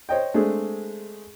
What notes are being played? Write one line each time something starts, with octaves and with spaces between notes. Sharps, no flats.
C5 C#5 D#5 G5
G#3 A3 C4 D4 G#4